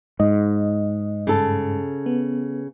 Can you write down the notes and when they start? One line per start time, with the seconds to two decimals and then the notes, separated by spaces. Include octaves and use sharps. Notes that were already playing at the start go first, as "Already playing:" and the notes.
0.20 G#2 D#5
1.27 G2 C#3 A4
2.06 B3